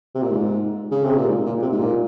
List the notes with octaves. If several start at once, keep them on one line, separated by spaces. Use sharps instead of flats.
C3
A#2
G#2
C#3
C3
A#2
G#2
A#2
C3
G#2
A#2